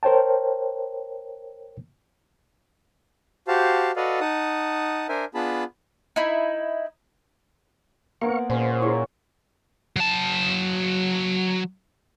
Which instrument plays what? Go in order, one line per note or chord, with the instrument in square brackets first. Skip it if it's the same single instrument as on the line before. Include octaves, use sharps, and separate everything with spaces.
[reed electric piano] A#4 C5 C#5 G5 A5
[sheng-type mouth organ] F#4 G4 C5 F5 A5
F#4 A4 B4 D5 D#5 F5
D#4 F#5 A5 D#6
D4 A#4 C5 E5 G#5
B3 D4 F4 G#4 A5 B5
[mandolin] D#4 E4
[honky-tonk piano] A#3 B3 [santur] A#4 C5 F#5 [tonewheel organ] F5 C#6
[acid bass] A#2 [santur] G#3 C#4 G#5 [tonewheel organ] C5
[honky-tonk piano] E4 G#4 [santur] C#5
[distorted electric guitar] F#3 A5